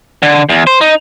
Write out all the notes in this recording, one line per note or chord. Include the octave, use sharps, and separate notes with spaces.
D3
E2
C5
D#4